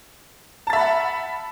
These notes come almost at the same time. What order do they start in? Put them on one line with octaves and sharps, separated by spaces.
A5 A6 E5 B5 F#5